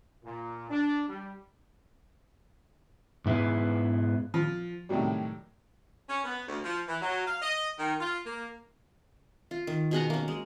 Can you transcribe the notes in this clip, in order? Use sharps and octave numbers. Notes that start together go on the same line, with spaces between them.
A#2
D4
G3
G#2 B3 E4 G#4 B4
F3
A2 C3 D#3 F#3 G3
C#4
B3
D2
F3
E3
F#3
F5
D#5
D#3
F4
A#3
F4
D#3
B2 G#4 F#5 A#5
A#3 C#4
G#3